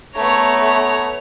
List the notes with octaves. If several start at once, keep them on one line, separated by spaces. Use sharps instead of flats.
A3 B3 C#5 A#5